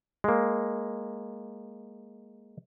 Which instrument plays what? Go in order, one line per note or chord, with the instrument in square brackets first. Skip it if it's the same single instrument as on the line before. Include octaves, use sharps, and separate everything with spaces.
[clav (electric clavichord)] G#3 A#3